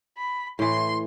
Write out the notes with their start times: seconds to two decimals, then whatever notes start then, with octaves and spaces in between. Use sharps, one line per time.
0.18 B5
0.59 A2 E3 C6